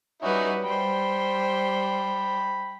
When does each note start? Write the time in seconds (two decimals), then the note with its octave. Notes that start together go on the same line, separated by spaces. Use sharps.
0.22 G3 C#4 D#4 E4 F#4 B4
0.64 G3 C5 G5 B5